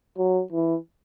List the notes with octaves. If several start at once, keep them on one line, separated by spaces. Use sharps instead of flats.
F#3
E3